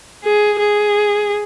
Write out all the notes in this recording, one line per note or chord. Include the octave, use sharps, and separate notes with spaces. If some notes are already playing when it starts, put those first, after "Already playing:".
G#4
G#4